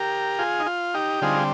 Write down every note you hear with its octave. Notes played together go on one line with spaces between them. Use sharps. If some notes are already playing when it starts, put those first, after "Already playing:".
Already playing: G4 A#4
F4 G#4
D#4
F4
D#4 G4
D3 G3 C4 D#4 F4 G#4